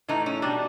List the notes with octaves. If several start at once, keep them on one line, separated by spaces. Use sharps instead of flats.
A2 E3 A3 D#4
C#4
B2 G3 D4